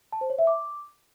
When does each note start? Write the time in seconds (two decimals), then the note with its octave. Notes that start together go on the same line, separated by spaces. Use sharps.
0.12 A5
0.21 C5
0.30 C#5
0.39 E5
0.47 D6